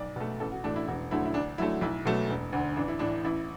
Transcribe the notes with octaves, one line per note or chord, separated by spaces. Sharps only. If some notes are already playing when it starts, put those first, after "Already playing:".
Already playing: B1 D5
B2 A3
A1 A4
F#4
A2 E3 A3 D4
E4
E1 F#4
D2 D3 F#3 A3 E4
E4
D2 D4
D3 F#3 A3 E4
B1 E4
B2 F#3 A3
E1
D2 D3
A1 D4
E4
A2 E3 D4
A1 E4